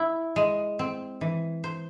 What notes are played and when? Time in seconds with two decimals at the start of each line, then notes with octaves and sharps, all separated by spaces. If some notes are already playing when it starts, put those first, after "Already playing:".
Already playing: E4
0.36 G#3
0.79 C4
1.21 E3
1.64 C5